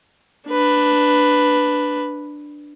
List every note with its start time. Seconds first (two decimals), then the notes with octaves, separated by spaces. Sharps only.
0.48 D4 B4